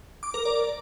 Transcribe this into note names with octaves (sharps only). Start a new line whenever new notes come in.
D6
A#4
D5